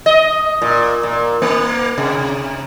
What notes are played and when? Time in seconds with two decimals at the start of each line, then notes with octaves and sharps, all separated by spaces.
0.06 D#5
0.62 A#2
1.03 A#2
1.42 A#3
1.98 C3